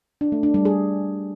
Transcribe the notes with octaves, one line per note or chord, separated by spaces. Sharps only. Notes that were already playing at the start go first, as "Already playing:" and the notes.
D4
A3
D4
G3
G#4